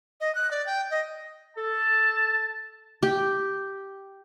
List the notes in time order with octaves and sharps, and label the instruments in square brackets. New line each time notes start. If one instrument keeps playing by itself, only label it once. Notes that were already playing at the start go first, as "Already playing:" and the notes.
[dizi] D#5
F#6
D5
G5
D#5
[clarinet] A4 [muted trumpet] A5
[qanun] G4